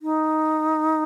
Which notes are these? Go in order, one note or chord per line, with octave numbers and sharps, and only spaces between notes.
D#4